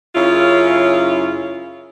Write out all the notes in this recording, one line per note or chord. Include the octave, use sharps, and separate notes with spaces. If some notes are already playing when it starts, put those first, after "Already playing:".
F#2 C#3 C#4 E4 F4